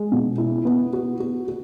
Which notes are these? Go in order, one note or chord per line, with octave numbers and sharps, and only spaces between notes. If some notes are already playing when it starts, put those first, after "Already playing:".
Already playing: G#3
B2
E4
B3
F#4
F#4
F#4